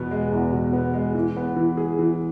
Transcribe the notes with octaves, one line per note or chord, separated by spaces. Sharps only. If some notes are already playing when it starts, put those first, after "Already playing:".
Already playing: E2 B2 B3
G#3
E2
B2
B3
G#3
E3
B3
E3
G#4
E3